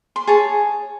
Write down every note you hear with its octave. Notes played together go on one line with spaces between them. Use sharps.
C6
G#4 C#5 A5